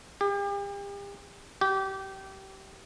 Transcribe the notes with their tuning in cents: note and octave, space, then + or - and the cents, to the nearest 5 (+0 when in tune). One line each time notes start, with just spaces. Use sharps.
G4 +40
G4 -25